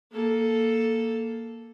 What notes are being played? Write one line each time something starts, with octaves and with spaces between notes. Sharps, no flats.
A#3 A4